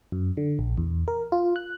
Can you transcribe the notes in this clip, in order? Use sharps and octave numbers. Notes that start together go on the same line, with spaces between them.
F#2
D3
A#1
E2
A#4
F4
F#6